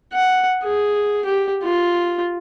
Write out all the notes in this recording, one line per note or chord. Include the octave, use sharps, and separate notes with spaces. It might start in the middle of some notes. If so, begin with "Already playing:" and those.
F#5
G#4
G4
F4